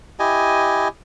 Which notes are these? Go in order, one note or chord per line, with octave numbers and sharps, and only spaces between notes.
E4 G4 D#5 G#5